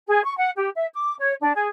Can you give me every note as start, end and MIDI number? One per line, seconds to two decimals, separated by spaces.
0.07 0.22 68
0.24 0.35 85
0.36 0.49 78
0.56 0.70 67
0.75 0.87 76
0.94 1.16 86
1.19 1.33 73
1.40 1.53 62
1.54 1.68 68